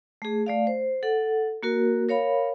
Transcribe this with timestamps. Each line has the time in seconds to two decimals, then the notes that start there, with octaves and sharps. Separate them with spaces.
0.22 A3 G#4
0.46 A3 D5 F5
0.67 C5
1.03 A4 F#5
1.63 A#3 F#4 A#4
2.09 A#4 C#5 F5 B5